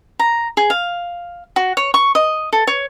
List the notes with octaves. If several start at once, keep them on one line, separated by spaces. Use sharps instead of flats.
A#5
G#4
F5
F#4
C#5
C#6
D#5
A4
C#5